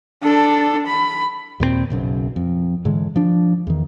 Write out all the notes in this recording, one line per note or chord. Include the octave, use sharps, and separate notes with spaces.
D4 A4
B5
D#2 A#2 G3 C4
F#1 B1 F#2
F2
G#2 D3 E3 G#3
F3 D4
E2 D#3